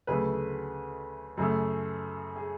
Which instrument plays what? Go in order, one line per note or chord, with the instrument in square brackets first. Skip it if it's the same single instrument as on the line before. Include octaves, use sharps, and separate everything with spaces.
[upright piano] D2 C#3 F#3 A3 G#4 B4
F#2 C#3 F#3 A3 G#4
G#4